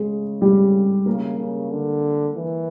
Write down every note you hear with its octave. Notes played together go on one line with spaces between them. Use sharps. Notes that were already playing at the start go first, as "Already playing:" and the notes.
Already playing: C#3 G#3 G#4
G3 G4
C#3 A#3 A#4
C#3
D3
E3